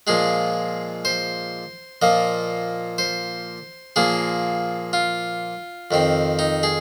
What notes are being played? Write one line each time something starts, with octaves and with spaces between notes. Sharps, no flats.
A#2 F3 G#3 G#4
C5
A#2 F3 A#3 D#5
C5
A#2 F3 A#3 G#4
F4
F2 D#3 C4
D#4
G#4